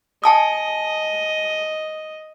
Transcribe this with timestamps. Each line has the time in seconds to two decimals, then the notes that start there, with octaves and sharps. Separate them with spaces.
0.24 D#5 G#5 A5 D#6